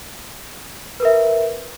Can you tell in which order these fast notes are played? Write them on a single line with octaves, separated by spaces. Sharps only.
B4 A#4 E5